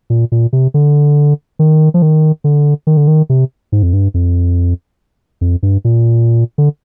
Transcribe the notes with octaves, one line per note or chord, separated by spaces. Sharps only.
A#2
A#2
C3
D3
D#3
F3
D#3
D3
D#3
D3
D#3
C3
G#2
F2
G2
F2
F2
G2
A#2
D3